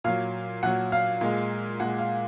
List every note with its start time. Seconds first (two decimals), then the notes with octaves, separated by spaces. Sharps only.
0.04 A#2 F#3 F5
0.63 A#2 F#3 F#5
0.92 F5
1.21 A#2 G#3
1.80 A#2 G#3 F#5
1.99 F5